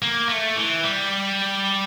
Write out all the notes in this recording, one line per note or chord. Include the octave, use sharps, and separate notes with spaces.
A#3
A3
E3
G3